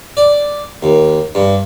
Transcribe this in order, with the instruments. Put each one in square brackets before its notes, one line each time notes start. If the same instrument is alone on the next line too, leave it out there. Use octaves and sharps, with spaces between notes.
[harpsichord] D5
D#2
G2